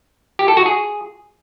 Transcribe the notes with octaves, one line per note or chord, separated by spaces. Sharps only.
G4
A4
F#4
G#4